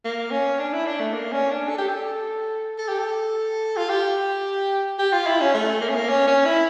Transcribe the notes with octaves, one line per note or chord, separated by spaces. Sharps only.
A#3
C#4
D4
E4
D4
A3
A#3
C#4
D4
A4
G4
A4
A4
G4
A4
F4
G4
G4
F4
E4
C#4
A3
A#3
C#4
A#3
C#4
C#4
E4